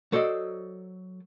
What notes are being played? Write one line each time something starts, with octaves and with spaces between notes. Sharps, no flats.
F#3 A4 C5 D5 D#5